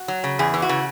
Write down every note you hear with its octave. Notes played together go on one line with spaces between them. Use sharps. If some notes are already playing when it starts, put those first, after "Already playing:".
Already playing: F#4
F#3
C#3
E2 G#4
E3
F#4
C#3